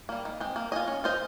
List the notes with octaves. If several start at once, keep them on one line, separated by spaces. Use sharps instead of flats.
G3 A#3
D#3
G#3 C4
A#3
F4 G#4 D#5
C#4
F4 C5 D#5